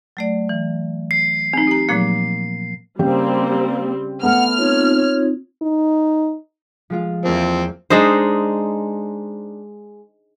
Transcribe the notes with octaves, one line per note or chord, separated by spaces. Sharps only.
F#3 A3 D5
E3
C7
C4 D#4
G4 A#5
A#2 F3 F#3 A3 A#3
C#3 G3 A#3 C4 G4
A3 B3 F#5 B5 F6
C4 D#4 F4 C#5
C#5
D#4
F3 G#3 F4
E2 F3 A#3 C4
G#3 D4 D#4 C5